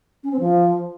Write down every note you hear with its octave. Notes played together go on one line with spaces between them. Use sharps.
C#4
C4
F3